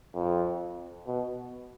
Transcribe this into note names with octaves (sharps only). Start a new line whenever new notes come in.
F2
B2